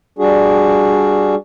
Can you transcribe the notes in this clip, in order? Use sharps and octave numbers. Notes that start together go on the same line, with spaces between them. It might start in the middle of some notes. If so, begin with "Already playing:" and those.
G3 D4 F#4 G#4